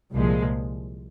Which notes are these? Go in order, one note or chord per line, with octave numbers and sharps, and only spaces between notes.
C2 A#2 F3 G#3